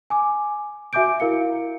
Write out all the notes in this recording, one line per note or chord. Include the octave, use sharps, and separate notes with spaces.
G#5 D6
F#4 E5 G#5 D6 G6 D7
E4 A#4 F5 C#7